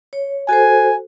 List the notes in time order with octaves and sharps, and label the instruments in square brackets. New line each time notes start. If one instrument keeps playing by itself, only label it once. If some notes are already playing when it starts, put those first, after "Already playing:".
[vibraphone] C#5
[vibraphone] F#4 A4 C5 [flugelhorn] G#5